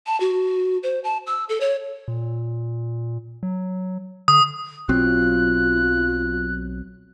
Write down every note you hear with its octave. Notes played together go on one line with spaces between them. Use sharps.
A5
F#4
C5
A5
E6
A4
C#5
A#2
F#3
D3 D#6
B1 F#3 C4 F4 F#6